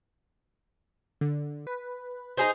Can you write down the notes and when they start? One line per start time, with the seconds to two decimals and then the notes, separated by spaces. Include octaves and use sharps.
1.21 D3
1.67 B4
2.37 D#4 G#4 C5